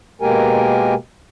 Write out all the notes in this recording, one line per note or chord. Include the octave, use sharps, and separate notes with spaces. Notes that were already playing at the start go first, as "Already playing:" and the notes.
B2 G#3 A#3 G4 A#4 G#5